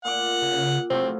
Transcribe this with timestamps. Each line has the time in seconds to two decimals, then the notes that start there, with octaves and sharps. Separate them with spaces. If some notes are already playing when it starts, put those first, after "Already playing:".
0.05 A#2 F#5 D6
0.42 C#3
0.90 A2 C3 F3 F#3 C4